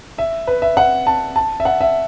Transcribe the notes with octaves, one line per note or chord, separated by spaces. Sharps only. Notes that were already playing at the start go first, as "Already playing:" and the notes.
E5
B4
E5
F#5
A5
A5
E5
F#5
E5